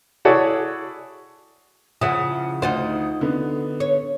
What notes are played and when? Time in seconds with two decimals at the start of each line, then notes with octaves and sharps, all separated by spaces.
0.25 E4 F#4 G#4 A4 C#5 D5
2.01 C#3 F3 E4 F#5 D#6
2.62 D2 D#4 F4 C5 F#5
3.21 D3 B3
3.80 C#5